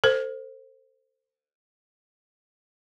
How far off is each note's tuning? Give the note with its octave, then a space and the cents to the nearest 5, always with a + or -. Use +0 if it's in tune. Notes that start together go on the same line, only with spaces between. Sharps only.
A4 +35 C5 +0